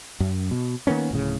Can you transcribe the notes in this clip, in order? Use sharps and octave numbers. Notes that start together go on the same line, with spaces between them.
F#2
B2
D#3 A#3 B3 C#4
D1 A2 C#3